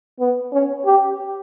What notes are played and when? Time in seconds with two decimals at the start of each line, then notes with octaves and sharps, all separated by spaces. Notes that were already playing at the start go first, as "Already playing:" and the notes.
0.20 B3
0.53 C#4
0.86 G4